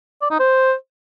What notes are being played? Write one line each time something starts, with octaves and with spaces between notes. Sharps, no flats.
D5
D#4
C5